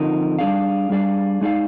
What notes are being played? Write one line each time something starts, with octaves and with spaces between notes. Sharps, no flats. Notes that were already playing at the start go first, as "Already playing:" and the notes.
Already playing: D3 F3 C4 D#4 A#4
G3 D4 G#4 D5 F5
G3 D4 G#4 D5 F5
G#3 D#4 G#4 D5 F5